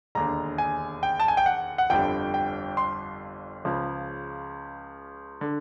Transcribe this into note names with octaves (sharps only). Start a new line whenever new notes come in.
E1 D#2 D3 A#5
G#5
G5
A5
G#5
G5
F#5
F#5
G1 F2 D3 G3 G5
G5
C6
C#2 C#3 F3
D3